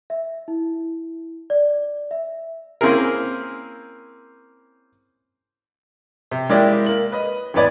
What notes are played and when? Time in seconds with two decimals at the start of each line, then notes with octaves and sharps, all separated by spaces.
0.10 E5
0.48 E4
1.50 D5
2.11 E5
2.81 A#3 C4 C#4 E4 G#4 A#4
6.31 C3
6.49 G#3 A#3 E4 G4 D5
6.86 A#3 F#7
7.12 B4 D#5
7.54 G#1 E2 B3 B4 D5 G#6